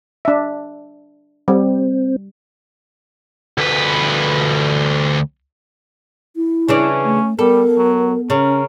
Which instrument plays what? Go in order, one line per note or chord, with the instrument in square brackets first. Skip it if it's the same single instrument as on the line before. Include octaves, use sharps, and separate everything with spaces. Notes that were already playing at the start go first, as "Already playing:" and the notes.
[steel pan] D4 E5
[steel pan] G3 [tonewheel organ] C4
[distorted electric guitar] D2 B4
[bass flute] E4
[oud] C#3 E3 D4 [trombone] C#4
[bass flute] A3
[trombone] G3 [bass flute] B3 [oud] A4 [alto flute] A#4
[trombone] F#3
[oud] C#3 [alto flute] C#4 [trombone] A#4